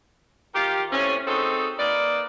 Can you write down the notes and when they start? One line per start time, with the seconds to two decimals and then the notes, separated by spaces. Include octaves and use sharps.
0.54 D#3 F4 G4
0.91 A2 C3 C#4
1.27 C4 D#4 F#4 G#4 A4
1.79 A#3 D#4 B4 D5